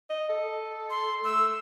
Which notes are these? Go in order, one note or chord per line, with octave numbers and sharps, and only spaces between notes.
D#5
A4
C6
A3 E6